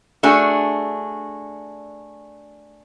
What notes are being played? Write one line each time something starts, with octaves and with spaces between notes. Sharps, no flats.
A3 D4 F#4 G#4